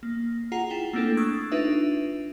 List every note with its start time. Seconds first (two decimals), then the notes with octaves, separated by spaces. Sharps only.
0.03 A#3
0.52 F4 G#4 F#5 A#5 C7
0.70 E4 G5 G7
0.93 A3 A#3 C4 D4 E4 A4
1.17 C#6 D#6 E6 F#6 G#6 A6
1.51 D4 D#4 F4 B4 E5